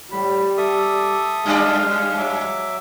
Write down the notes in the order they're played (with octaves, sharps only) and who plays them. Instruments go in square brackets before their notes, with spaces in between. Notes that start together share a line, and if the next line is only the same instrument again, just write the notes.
[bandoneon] A2 [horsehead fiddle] G3 [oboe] B5
[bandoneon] A4 E5 D#6 [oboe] D6
[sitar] F#2 G3 D5 [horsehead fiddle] G#3 [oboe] F5
[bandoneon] F#3 E5 D6